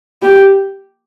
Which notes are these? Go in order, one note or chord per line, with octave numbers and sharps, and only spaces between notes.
G4